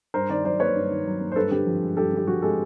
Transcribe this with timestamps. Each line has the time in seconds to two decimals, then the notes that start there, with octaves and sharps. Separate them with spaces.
0.14 G2 A#4 C5
0.29 D#3 C5 D5
0.45 F#3 C5 D5
0.60 A#3 B4 C#5
0.76 G2
0.91 D#3
1.06 F#3
1.20 A#3
1.32 C5
1.36 G2 A4 B4
1.51 D3 G4 A4
1.67 F3
1.82 G#3
1.97 G2 G4 A4
2.12 D3 G4
2.27 F3 F#4 G#4
2.42 G#3 G4 A4